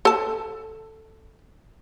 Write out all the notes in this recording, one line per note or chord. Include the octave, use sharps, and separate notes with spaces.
A4 A5